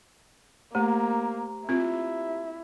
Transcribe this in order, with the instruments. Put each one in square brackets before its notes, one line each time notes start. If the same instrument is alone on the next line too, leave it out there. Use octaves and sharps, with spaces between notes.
[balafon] A3 [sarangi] A#3 [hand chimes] G4 C5 A#5
[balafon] C4 F4 [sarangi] E4